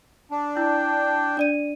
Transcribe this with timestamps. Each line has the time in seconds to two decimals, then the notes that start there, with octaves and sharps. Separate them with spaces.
0.31 D4
0.57 E4 G5
1.37 D4 D5 D#7